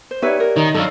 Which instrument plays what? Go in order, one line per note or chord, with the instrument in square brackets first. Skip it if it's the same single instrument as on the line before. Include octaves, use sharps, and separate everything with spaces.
[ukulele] C5
[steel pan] B3 C#5 E5 [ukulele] D#4 B4 [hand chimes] G4 D5
[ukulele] A#4
[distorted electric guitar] D#3 [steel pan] D#4 D#5 [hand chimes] C#5
[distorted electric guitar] G2 F#3 [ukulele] D#4 [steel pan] A4 F5